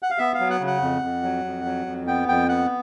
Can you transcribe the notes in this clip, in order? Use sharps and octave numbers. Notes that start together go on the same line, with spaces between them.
F#5
F5
B3 E5
F5
F#3
F#5
C#3
F#5
F2
F2
F#3
F2
F#3
F2
B3 G5
F2 G5
B3 F#5